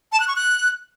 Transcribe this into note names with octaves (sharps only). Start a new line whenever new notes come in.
A5
F#6
C#6
F#6